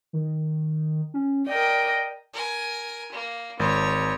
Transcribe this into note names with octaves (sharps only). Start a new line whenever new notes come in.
D#3
C#4
A#4 D5 D#5 G5
A#4 G#5
A#3
G#1 C#5 C#6